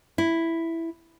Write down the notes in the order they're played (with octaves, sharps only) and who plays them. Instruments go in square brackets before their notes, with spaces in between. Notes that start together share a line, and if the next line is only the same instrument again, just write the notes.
[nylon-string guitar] E4